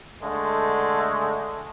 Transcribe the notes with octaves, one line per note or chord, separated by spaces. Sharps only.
D3 G#3 A3